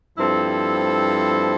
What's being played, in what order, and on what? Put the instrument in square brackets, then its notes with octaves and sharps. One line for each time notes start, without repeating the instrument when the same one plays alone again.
[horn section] G2 F3 C4 E4 A4